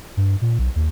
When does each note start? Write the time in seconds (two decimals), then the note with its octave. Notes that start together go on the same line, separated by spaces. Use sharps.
0.17 G2
0.42 A#2
0.59 B1
0.76 D#2